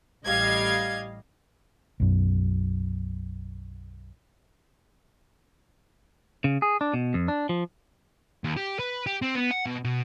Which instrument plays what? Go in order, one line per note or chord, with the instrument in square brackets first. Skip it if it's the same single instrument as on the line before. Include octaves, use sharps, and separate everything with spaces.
[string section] A1 G3 D#5 F5 G#6
[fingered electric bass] B1 F#2
[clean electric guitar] C#3
G#4
D4
B2
F2
D4
F3
[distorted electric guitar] D#2
G4
B4
G4
C4
B3
F#5
B2
B2